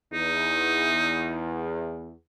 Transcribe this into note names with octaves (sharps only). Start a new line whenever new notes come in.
E2 D#4